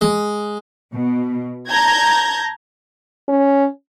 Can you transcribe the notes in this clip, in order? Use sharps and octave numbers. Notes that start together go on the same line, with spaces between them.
G#3
B2
A5 A#5 G6 G#6 A#6
C#4